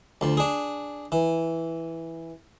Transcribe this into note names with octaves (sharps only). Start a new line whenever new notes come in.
D2 F3
D4 G#4
E3